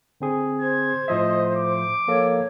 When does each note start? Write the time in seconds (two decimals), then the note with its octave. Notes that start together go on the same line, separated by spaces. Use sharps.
0.21 D3 C4 G#4
0.61 C5 G#6
1.08 A2 F3 D#5 E5
1.56 D6
2.08 F3 A#3 A4 C#5